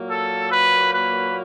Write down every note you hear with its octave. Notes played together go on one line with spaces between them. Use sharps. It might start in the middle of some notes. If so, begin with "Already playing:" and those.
Already playing: A#2 F#3 A#3
A4
B4
B4